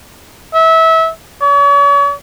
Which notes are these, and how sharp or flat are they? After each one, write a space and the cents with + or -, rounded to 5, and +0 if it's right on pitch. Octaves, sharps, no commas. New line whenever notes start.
E5 -25
C#5 +40